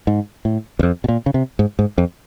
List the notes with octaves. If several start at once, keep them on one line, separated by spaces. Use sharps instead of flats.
G#2
A2
E2
F2
B2
A#2
C#3
C3
G#2
G#2
F2